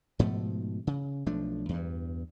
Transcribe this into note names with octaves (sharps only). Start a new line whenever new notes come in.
G#2 B2 F3 A3
C#3
B1 F3 A3 D4
E2 G2